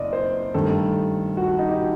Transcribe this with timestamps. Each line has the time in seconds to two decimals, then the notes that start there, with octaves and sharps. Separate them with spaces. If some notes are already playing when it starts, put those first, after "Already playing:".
Already playing: F#1 D5 D#5
0.13 C5
0.54 G2 D#3 A3 A4
1.37 F#4
1.48 F#4
1.59 D#4
1.68 G4
1.80 F#4